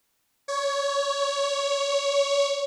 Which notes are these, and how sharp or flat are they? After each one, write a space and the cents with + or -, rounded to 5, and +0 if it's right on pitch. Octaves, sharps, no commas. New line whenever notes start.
C#5 +15